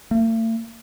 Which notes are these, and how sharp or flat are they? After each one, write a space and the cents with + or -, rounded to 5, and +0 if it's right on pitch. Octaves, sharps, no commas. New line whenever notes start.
A3 +45